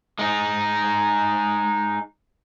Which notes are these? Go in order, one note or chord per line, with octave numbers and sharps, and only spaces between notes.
G#3 D#4